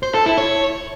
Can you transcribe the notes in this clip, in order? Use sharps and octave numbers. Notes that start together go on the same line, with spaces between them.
C5
A4
E4
C#5